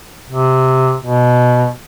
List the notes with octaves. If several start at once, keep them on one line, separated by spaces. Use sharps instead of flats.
C3
B2